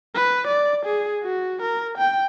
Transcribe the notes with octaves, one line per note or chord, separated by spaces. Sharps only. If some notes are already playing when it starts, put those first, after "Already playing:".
B4
D5
G#4
F#4
A#4
G5